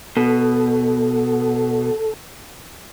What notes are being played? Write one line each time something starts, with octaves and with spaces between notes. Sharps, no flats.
B2 A4